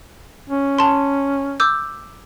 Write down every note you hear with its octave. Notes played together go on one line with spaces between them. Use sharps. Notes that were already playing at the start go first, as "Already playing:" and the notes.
C#4
A5 C6
D6 E6 G6